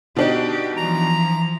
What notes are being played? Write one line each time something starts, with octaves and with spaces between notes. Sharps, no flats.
B2 D4 D#4 G4
E3 F3 A#5